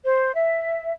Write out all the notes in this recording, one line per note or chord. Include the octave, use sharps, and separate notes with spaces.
C5
E5